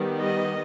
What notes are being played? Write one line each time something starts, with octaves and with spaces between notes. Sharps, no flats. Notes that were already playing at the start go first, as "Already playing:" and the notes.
Already playing: D#3 G3 B3
D#5